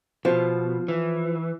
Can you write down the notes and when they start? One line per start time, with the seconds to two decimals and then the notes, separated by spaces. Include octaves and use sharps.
0.25 B2 F3
0.88 E3